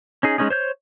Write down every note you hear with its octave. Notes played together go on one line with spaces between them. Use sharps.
C#4 D#4 G#4
G#3 B3 C#4 D#4 G#4
C5 C#5 G6